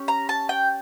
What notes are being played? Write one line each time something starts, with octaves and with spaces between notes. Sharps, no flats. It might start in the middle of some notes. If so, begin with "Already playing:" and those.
Already playing: C#4 G4
A#5
A5
G5